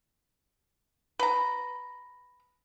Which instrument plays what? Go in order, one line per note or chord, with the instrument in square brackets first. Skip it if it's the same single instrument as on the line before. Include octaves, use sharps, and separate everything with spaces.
[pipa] B4 A#5